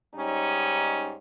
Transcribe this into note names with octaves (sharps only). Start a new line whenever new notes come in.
G#2 G3 C#4 D#4